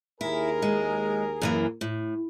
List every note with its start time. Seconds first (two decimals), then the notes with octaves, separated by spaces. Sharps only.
0.21 D#2 E4 G#4 A#4
0.62 G#3
1.42 F#2 E3 A#3
1.81 A2